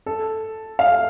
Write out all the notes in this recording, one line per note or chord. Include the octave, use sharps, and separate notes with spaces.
A4
F5